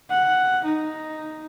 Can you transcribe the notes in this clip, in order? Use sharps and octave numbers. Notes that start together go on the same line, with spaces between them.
F#5
D#4